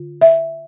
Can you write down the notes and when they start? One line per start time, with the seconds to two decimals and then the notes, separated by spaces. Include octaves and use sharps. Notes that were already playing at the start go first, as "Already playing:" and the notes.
Already playing: D3 F4
0.22 E5